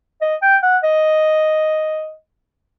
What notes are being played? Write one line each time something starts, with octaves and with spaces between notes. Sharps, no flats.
D#5
G5
F#5
D#5